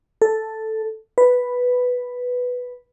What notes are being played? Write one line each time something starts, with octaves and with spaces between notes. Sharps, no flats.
A4
B4